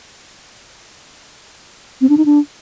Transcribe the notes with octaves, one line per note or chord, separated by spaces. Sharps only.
C4
D4
D#4
D4